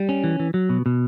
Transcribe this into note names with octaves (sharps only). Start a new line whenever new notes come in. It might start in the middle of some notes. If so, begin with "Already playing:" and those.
Already playing: G3
C#4
E3
E3
F#3
B2
B2